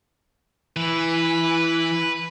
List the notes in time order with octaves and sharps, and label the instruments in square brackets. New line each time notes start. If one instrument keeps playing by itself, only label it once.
[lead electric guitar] E3 [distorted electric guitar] B4